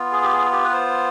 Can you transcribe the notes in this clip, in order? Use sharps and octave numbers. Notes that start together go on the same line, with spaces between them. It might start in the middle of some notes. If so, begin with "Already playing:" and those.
Already playing: B3 F4
G#4
G4
G#4
G4
B4
C5